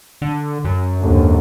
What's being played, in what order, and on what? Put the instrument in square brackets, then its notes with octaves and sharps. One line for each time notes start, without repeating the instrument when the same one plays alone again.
[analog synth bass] D3
F#2
[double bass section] D#2 G#2 D3